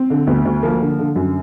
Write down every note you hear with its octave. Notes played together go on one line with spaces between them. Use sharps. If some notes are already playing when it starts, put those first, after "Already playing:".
Already playing: C4
D3
D2 B3
D2
F3 A#3
D3
D3
F#2